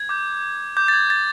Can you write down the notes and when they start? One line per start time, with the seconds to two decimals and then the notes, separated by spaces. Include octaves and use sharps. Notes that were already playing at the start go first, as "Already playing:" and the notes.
Already playing: G#6
0.09 D6 G6
0.77 D6 G6
0.88 A6
0.93 G#6
1.10 A6